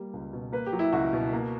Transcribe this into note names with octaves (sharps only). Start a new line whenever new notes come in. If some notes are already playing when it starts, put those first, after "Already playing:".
Already playing: G3 A#3
C#2
B2
A#3 B4
G4
F#3
E4
C#2 F#4
B2
A#3